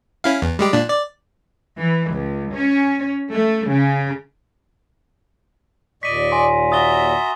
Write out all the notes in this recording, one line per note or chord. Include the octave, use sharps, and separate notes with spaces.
C#4 E4 F5
E2
G3 G#3 G4
A#2 D4
D5
E3
C#2
C#4
A3
C#3
D#2 A#2 D5 D#5 C#6 B6 D#7
G#5 C6 A#6
F#4 E5 A#5 D#6 A6 G7